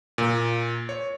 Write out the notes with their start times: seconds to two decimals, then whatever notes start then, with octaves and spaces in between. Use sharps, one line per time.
0.18 A#2
0.89 C#5